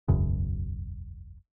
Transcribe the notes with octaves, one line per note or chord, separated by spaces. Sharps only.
E1 B1 F#2 C#3